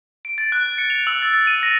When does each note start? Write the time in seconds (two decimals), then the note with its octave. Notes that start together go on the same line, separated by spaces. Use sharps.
0.25 D7
0.38 A6
0.52 F#6
0.65 F#6
0.78 C#7
0.90 F7
1.07 E6
1.22 A6
1.34 A6
1.47 D#7
1.63 A#6